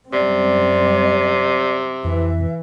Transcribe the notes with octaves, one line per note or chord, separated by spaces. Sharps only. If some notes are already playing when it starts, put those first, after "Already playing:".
F#2 C3 G3 C4 D5
F2 E3 E5